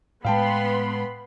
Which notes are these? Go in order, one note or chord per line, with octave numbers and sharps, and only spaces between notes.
A2 G#3 B3 F5 G5 A5 B5 C6